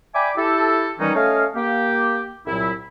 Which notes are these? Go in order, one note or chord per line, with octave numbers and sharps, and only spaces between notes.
D5 E5 G5 G#5 B5 D6
E4 G4 A4
D#3 E3 G3 C#4 D#4
A3 C#4 C#5 D#5 F5
A#3 G4
C2 A#2 F#3 E4